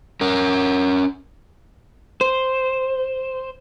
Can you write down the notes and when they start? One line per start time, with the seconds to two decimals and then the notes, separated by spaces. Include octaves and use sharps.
0.21 C#4 A#4
2.21 C5